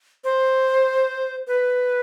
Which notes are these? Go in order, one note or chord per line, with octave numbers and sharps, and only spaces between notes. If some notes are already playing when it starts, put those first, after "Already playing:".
C5
B4